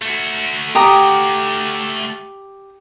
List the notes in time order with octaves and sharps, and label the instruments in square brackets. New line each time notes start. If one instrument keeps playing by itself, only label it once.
[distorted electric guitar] A3 F#4
[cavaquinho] G4 A#5 D#6